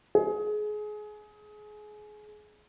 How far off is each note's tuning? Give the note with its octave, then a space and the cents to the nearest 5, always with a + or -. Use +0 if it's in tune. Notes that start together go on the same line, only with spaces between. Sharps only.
G#4 +25